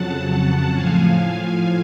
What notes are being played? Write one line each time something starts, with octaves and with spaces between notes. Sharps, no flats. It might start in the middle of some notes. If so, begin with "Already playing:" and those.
Already playing: F2 C#3 F#3 F#5 A5
A2 F3 F5 G#5